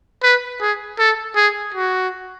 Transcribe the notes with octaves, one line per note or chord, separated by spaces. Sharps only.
B4
G#4
A4
G#4
F#4